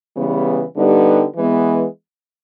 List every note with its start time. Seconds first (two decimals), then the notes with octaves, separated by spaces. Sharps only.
0.16 C#3 E3 G3 B3
0.77 D3 G3 B3 D#4 G4
1.36 E3 G#3 B3